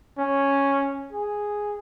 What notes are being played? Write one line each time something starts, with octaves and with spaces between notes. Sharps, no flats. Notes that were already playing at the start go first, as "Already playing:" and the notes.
C#4
G#4